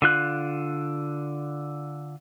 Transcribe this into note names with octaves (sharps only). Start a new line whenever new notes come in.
D3 F4 F#6